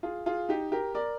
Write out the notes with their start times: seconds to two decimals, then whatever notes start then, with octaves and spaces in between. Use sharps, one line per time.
0.03 F4 G#4
0.26 F4 G#4
0.49 D#4 G4
0.72 G4 A#4
0.94 A#4 D5